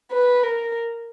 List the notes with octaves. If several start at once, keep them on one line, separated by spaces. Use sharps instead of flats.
B4
A#4